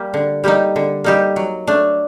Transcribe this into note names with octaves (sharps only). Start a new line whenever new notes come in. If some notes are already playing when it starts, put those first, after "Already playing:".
Already playing: G3 A#3 G4
D3
G3 A#3 D#4 G4
D3
G3 A#3 D#4 G4
F#3
A3 D4